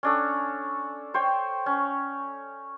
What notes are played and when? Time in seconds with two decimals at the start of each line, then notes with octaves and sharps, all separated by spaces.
0.03 C#4 D4 A4
1.14 C5 C#5 G5
1.66 C#4